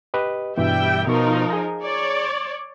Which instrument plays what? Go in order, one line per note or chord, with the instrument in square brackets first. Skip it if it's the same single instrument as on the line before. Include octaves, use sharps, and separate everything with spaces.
[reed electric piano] G4 B4 D#5
[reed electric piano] G2 B2 E3 [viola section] G3 E5 G5
[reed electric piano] B2 C#6 [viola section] F3 D#4 A#4
[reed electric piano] G#4 A#5
[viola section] C#5 D5